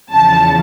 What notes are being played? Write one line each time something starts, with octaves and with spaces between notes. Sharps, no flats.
E2 C#3 F3 A5